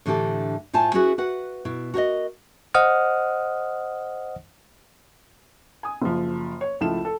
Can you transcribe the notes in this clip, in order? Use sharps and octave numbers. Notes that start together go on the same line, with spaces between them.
A2 D3 E3 D4 G4 A4
A2 F4 C5 G#5 A5
C#4 E4 F#4 G#4 B4
F#4 B4 F#5
B2 E4
F#4 A#4 C#5 D#5
C5 D#5 F#5 D#6 F6
G#5 D#6
F#1 F3
C#5
C#2 F3 A3 E4 E7
A4